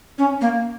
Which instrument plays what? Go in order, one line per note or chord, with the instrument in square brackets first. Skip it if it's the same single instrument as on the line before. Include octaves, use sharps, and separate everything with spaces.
[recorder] C#4
A#3